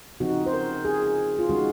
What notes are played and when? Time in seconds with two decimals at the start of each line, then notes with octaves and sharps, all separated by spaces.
0.20 C#3 F3 C4 D#4 F#4
0.46 C5
0.53 A#4
0.85 G#4
1.39 F4
1.49 D#3 G#3 C#4 F#4